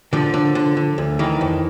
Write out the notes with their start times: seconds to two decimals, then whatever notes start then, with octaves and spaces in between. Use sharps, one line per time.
0.13 D3 F3
0.34 D3
0.55 D3
0.77 D3
0.98 D2
1.19 D#3 E3
1.41 F2